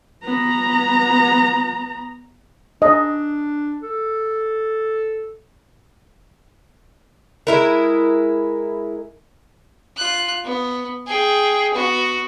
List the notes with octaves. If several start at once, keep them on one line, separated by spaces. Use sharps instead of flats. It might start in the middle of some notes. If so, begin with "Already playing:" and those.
B3 A#5
D4 D#5
A4
G#3 E4 A#4
F4 F#6
B3
G#4 G5
B3 F#4